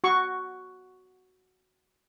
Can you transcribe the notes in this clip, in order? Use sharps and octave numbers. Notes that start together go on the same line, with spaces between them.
F#4 C#6